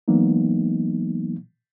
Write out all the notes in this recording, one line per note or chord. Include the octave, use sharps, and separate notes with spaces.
E3 F#3 G#3 A#3 B3 D#4